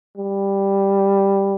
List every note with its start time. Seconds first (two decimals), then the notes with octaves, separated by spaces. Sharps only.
0.17 G3